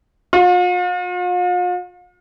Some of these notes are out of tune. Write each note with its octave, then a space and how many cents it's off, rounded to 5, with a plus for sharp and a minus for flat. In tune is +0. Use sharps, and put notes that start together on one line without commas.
F4 +45